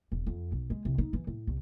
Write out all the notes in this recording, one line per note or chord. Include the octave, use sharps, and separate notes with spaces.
E1
F2
B1
G#3
C2
D#4
E3
A2
C2